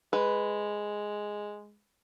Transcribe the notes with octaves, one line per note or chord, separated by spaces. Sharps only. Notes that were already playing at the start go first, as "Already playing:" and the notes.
G#3 B4